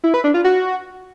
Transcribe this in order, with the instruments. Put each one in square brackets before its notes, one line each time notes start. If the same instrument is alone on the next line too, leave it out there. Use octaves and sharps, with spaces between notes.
[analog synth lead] E4
B4
D4
F4
F#4